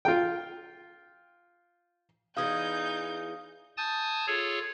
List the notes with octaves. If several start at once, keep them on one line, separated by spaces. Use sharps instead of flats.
F4 G5
E2 E3 D#4 G#4 F5 D#6 G6
G#5 A5 D#6 G6 A6
F4 G#4 A4 C#5